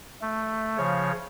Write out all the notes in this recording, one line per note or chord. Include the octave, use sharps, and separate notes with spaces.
A3
C#3 F3 C#5